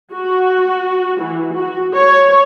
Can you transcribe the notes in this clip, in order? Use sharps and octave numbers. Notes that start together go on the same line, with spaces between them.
F#4
E3
F#4
C#5